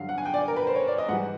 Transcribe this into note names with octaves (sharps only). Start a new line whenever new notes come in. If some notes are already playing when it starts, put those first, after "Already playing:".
Already playing: G2 D3 F#3 F5
F#5
G#5
G5
D5
A#4
B4
C5
C#5
D5
D#5
G#2 E3 G3 F#5